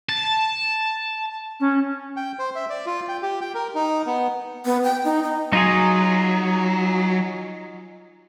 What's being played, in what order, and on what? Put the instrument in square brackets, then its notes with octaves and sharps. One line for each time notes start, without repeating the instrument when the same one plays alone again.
[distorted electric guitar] A5
[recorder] C#4
[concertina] G5
C5
E5
D5
F4
G5
G4
G5
A#4
D#4
B3
[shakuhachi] B3
G5
D#4
D#4
[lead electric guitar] F#3 [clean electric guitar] D#4 F4 G#4